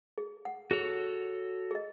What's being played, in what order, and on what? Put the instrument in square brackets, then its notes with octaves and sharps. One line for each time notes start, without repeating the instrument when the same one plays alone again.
[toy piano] G#4
F#5
[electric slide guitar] F#4 A4 C#5 [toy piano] G#4
[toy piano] G#4 D#5